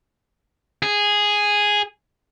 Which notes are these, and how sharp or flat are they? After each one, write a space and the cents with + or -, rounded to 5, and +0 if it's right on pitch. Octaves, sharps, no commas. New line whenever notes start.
G#4 -5